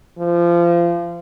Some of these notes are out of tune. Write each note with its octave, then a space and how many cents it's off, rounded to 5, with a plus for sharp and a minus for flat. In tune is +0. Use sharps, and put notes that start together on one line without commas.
F3 -25